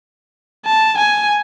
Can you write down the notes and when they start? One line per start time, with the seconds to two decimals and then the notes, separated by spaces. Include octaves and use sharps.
0.66 A5
0.98 G#5